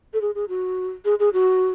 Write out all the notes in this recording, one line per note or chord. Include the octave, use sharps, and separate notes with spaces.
A4
G#4
G#4
F#4
G#4
G#4
F#4